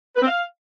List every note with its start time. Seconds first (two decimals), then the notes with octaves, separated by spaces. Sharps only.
0.16 B4
0.22 C4
0.27 F5